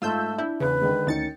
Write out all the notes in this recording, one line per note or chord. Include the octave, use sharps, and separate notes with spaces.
G#2 A3 F4 E6 G6
D4 E4 G6
E2 C#3 B4
D3 D#3 G#3
D2 D#3 C#4 D#4 A6 C#7